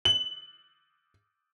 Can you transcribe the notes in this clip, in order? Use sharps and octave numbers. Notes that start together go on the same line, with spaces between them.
F#7